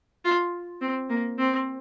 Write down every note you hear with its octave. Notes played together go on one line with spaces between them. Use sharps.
F4
C4
A#3
C4